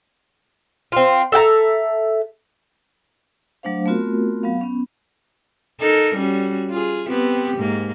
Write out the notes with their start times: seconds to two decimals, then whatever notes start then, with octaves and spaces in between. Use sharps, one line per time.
0.92 C4 F4
1.32 A4 E5 G5 A#5
3.63 F#3 A3 D4 C5 F5
3.86 A3 B3 C4 F4 F#4 A#4
4.43 F#3 B3 F5
4.61 B3 C#4
5.81 D#4 A4 A#4
6.15 G3 C#4 F#4
6.70 F4 G#4
7.08 B3 C4 G4
7.57 G#2 A#3